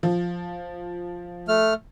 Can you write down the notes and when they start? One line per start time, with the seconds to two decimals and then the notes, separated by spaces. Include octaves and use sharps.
0.03 F3
1.48 A3 F6